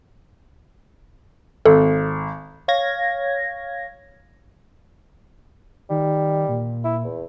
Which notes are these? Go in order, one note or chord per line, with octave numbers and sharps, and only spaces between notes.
G#1 A4
C#5 F5 G#6 A#6
D#3 G3
A#2
E4
E2